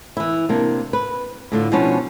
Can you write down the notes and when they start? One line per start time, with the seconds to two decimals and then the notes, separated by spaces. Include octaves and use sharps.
0.17 E3 E4
0.49 C3 A#3 D4
0.93 B4
1.52 A2 D3 F4
1.72 B2 F3 B3 C#4 D4